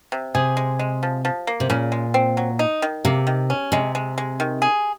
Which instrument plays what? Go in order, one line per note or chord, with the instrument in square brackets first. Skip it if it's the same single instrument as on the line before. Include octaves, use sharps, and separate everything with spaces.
[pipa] C3
[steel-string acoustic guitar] C3 [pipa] G#4
[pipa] G#3
G#3
F3
F3
A#3
[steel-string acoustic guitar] C3
[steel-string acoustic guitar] A#2 [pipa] C#3
[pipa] G#3
C4
F#3
D#4
D#3
[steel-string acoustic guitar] C3 [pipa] A#3
[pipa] D#3
C#4
[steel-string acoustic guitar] C3 [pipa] G#3
[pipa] G#3
G#3
D#3
G#4